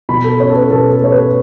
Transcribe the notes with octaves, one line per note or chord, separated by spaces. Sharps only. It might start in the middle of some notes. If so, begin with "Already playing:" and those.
B2 B5
A4
C#4 C#5
A4
B4
B2 A4
A4
A3 C#5
B4